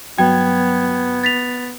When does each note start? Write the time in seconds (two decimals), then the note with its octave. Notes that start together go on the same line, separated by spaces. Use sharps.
0.18 G2 F#3 B3 G5 G#6
1.24 A6 B6 F7